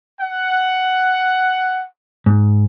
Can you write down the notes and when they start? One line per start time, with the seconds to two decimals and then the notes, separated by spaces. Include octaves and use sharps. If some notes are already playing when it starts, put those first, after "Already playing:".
0.21 F#5
2.26 G#2